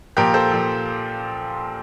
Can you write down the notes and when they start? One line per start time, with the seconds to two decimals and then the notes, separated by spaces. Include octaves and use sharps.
0.17 A#2 F3 G4 A#4
0.34 A4 C5
0.52 A#2 F3